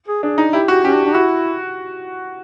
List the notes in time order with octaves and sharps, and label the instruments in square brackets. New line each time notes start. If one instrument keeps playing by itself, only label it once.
[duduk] G#4
[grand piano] D4 [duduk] G#4
[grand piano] D#4
[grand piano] E4 [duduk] G4
[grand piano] F#4 [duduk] G4
[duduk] C#4 [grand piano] G4
[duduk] D4
D4
[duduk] E4 [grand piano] F#4